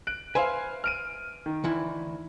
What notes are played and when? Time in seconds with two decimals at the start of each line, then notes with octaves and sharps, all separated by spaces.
0.07 F#6 D7
0.35 B4 C5 E5 F5 G#5
0.84 F6 D7 D#7
1.46 D#3
1.64 D2 E3 E4